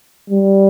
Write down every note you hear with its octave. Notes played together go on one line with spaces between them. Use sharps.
G3